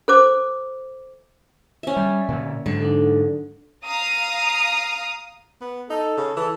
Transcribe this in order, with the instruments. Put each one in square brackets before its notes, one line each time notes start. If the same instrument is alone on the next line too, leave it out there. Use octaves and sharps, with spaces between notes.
[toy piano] A4 C5 D6
[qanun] C#4 E5
[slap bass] G3
A#2 D3
[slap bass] G#2 F#3 [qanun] D3
[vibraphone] D4 D#4 A4
[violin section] F5 A#5 D#6
[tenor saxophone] B3
[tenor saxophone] D#4 [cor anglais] A4
[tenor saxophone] C#3
[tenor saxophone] E3 [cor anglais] A4